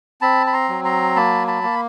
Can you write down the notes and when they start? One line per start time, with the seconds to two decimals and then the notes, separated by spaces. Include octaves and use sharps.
0.21 C4 A5 B5
0.47 B5
0.53 A#5 C6
0.69 F#3
0.85 A#5 C6
1.16 A#3 A5 B5
1.47 A5 B5
1.63 A#3